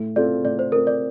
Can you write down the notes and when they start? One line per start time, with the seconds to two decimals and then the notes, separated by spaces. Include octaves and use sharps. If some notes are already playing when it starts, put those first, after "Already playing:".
Already playing: A2
0.16 A3 C4 F4 A4 D5
0.44 A2 D5
0.59 C5
0.72 A3 C4 F4 A4 A#4
0.87 D5